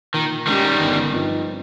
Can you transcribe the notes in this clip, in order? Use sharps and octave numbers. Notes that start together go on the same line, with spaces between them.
A#2 D#3
D#3 G3 G#3 C#4 G4
G1
G2 F3 C4 D#4